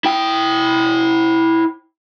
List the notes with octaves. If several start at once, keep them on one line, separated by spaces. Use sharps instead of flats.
E4 G5